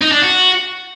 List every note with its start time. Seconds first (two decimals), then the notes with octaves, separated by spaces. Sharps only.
0.01 D#4
0.12 D4
0.22 F#4